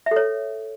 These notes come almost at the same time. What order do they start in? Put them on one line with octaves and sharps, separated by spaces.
E5 A4 C#5